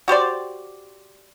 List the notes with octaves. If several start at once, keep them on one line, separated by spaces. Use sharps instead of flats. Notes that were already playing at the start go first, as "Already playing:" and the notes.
F#4 G4 C5 D5